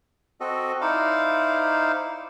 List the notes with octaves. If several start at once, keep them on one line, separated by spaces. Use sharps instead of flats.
C4 F#4 A4 D#5
D#4 E4 C5 D5 F5